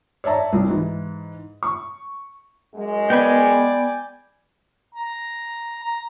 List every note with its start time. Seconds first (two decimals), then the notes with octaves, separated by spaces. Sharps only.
0.24 C#5 D5 E5 A5 A#5
0.53 C2
0.68 G#2 E3
1.63 C#6
2.75 F#2 G#3
3.10 B3 D5 G5 G#5 B5
4.95 A#5
5.83 A#5